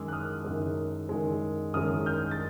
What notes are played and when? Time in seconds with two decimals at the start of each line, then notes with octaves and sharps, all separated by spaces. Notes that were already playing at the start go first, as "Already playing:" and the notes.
Already playing: F#2 D#3 G#3 D6 E6
0.08 F#6
0.13 D#6 F6
0.45 F#2 D#3 G#3
1.09 F#2 D#3 G#3
1.74 F#2 D#3 G#3 D#6 F6
2.06 F6 G6
2.31 A6